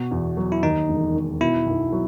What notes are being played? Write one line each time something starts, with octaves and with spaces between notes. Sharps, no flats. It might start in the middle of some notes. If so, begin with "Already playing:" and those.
Already playing: B2 F#4
E2
F#3
E4
D#2 D#4
E1
D#3
B2 E4
B1
F#3